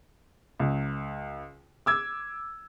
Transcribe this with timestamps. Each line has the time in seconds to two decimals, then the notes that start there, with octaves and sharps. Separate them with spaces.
0.60 C#2
1.86 D6 E6 G#6